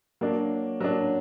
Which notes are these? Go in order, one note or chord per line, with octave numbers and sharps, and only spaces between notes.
F#3 A#3 D4
F#3 A#3 D4